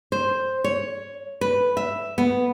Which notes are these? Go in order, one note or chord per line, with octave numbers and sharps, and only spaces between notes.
C5
C#5
B4
E5
B3